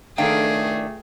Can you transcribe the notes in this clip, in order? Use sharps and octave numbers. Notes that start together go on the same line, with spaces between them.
C#2 D#3 A3 D4 G#4 A4 F5 G5